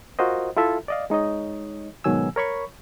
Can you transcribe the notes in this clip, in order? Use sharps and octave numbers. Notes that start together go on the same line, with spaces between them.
F4 F#4 A#4 C5 D#5
E4 F4 A4 E5
D5 D#5 F5
G#3 D#4 C#5 D#5
G#2 B2 D#3 F#3 G#5 E6
A#4 C#5 B5 C#6